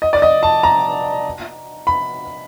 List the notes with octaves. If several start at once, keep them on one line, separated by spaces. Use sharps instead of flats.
D#5
D5
D#5
A5
A#5
B5